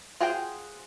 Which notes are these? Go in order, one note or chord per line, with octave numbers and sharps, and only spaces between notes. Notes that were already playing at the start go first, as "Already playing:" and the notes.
F4 F#4 G#4 C5 G5